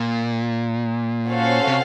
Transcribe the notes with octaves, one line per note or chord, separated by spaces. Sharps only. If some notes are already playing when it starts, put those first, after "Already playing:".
Already playing: A#2
C#4 F#4 A4 C5 F5
C3